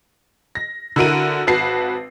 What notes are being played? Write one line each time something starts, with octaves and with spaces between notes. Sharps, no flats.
A#6
D3 E4 F#4 A#4 D7 D#7
G#1 F#4 B4 A5 C7